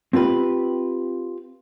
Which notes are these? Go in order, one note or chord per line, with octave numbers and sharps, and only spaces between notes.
C4 F4 G4 B4